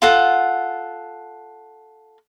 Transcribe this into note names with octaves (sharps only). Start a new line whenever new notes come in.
F4 A4 F#5